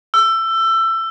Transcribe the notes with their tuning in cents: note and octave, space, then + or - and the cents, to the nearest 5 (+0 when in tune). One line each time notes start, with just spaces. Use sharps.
E6 +20